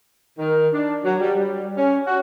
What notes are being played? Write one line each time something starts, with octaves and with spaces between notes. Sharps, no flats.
D#3
D4
F#3
G3
G3
C#4
F#4